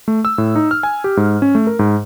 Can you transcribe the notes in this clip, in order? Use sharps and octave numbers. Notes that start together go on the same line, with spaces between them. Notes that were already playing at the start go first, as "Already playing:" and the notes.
A3
E6
A2
D#4
F6
G#5
G4
G#2
C#4
A3
A#4
G#2